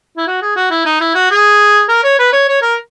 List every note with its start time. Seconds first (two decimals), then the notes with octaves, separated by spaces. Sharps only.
0.17 E4
0.27 F#4
0.42 G#4
0.56 F#4
0.71 E4
0.86 D#4
1.01 E4
1.15 F#4
1.31 G#4
1.89 A#4
2.04 C#5
2.19 B4
2.33 C#5
2.48 C#5
2.62 A#4